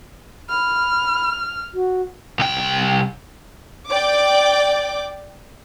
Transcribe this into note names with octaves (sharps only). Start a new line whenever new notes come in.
B5 F6
F#4
C2 G5
D5 G5 D6